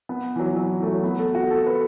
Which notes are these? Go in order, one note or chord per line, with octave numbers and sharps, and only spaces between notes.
B3
E3
F#3
E3
F#3
E3
A3
F#3
B3
A4
F#4
A4
B4